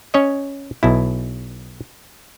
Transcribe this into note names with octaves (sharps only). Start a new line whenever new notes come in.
C#4 C#5 D#5
B1 B2 E4